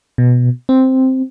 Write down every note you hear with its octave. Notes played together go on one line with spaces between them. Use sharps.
B2
C4